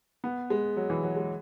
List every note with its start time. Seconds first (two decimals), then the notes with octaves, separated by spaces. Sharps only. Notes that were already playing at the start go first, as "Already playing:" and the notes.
0.24 B3
0.50 G#3
0.77 F#3
0.90 E3
1.03 F#3
1.16 G#3